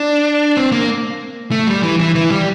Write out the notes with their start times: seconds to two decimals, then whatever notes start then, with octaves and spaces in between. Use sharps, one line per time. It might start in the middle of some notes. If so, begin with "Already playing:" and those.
Already playing: D4
0.57 C4
0.72 A#3
1.51 A3
1.67 G3
1.83 E3
1.99 E3
2.15 E3
2.31 G3